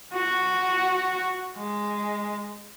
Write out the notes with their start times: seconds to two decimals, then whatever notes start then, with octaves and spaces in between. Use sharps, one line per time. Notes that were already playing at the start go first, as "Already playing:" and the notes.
0.13 F#4
1.57 G#3